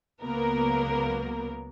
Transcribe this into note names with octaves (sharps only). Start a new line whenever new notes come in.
C#2 F#3 A#3 B3 A#4